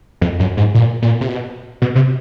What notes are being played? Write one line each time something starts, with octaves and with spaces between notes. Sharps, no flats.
F2
F#2
G#2
A#2
A#2
C3
B2
B2
C3